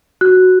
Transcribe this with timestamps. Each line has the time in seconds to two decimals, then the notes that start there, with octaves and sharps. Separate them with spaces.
0.21 F#4 F#6
0.37 F#4